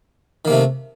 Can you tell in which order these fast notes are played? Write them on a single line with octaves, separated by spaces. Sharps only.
D#3 A#3 C3 A3